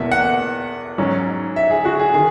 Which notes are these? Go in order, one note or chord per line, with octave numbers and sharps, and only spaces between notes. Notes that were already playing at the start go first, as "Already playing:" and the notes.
Already playing: E2 B2 A#3 E5
F#5
G#2 F#3 C#4
E5
G#4
F#4
G#4
D#3 G#4